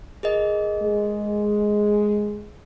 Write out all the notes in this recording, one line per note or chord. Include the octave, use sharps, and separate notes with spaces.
G#4 A#4 D#5
G#3